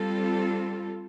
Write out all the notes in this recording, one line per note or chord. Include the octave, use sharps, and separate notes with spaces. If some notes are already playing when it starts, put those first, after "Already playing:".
Already playing: G3 C4 F4 A4